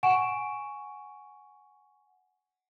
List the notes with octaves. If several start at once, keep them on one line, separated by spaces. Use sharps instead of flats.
F#5 G#5 C#6 D7 E7